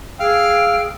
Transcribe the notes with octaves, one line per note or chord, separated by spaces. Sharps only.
G#4 F5 G5 E6